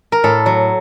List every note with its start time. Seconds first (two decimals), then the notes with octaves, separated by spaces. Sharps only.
0.12 A#4
0.24 A2 A4
0.46 F#3